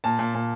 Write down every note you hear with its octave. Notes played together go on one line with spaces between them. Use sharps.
A#2 A5
A#2
A#2